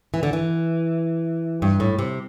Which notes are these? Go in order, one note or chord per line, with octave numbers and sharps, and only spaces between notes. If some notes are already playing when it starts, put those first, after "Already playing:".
E3
D3
E3
G2
A2
C3